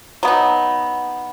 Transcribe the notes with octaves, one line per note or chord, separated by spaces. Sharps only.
F#3 B3 D#4